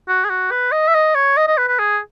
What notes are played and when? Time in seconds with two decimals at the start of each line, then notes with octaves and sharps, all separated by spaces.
0.08 F#4
0.24 G#4
0.30 F#4
0.51 B4
0.72 D#5
0.88 E5
0.94 D#5
1.15 C#5
1.37 D#5
1.47 D#5
1.58 B4
1.68 B4
1.79 G#4